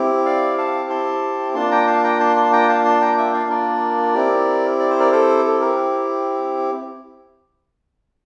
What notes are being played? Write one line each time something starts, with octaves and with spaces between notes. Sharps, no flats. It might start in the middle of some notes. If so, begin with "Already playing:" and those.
Already playing: C4 E4 G4
D5 F5
F5 A5
A5 C6
A#3 D4 F4 A5 C6
G5 A#5
F5 A5
G5 A#5
A5 C6
A5 C6
G5 A#5
F5 A5
A5 C6
G5 A#5
E5 G5
D5 F5
A#4 D5
C4 E4 G4
D5
C5
A#4 D5
A4 C5
A4
A#4